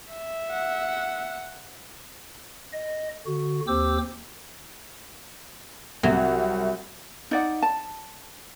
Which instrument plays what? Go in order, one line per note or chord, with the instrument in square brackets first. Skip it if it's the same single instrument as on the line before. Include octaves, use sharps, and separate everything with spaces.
[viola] E5
[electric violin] F#5
[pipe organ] D#5
D3 F#4
D#2 C4 G4 C5 D6 E6
[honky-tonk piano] C2 C3 [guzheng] F#3
[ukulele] D#4 D5 F#5
A5